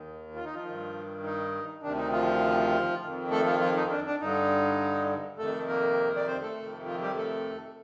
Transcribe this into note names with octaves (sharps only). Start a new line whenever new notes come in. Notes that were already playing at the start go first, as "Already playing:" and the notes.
Already playing: D#2 D#3
F4
D#4
F3 F4
G2 D#3
D#4
D2 C3 D#3 D4
D#4
F3 F4
F2 D#3
A3 A4
F3 F4
F3 F4
D#4
D4
D4
G2 D3 D#4
F2 C3 D#3 A3 A4
A#3 A#4
D5
C4 C5
A3 A4
F2 C3 D#3
F3 F4
G3 G4
A3 A4